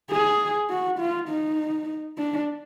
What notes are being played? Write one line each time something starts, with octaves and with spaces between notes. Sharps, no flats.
G#4
F#4
F4
D#4
D4